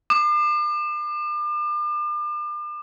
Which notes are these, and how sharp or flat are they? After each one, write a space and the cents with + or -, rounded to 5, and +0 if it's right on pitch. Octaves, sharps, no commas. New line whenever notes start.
D6 +40